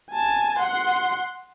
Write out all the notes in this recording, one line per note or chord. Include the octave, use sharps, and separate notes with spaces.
G#5 A5
F#5 C6